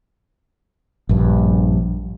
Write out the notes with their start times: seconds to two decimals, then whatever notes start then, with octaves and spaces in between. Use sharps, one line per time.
1.09 A#1 G2